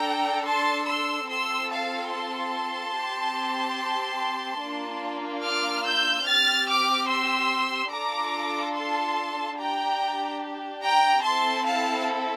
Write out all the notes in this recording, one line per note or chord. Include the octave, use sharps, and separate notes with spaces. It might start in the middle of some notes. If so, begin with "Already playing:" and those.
Already playing: D4 A4 G5 A#5
A5 C6
C6 E6
C4 F4 A4 C6 E6
F5 A5
A5 C6
C4 G4
A#3 D4 F4
D6 F6
E6 G6
C4 G4 F6 A6
D6 F6
C6 E6
D4 F4 A4 A#5 D6
A5 C6
D4 G4 G5 A#5
G5 A#5
C4 E4 A4 A5 C6
F5 A5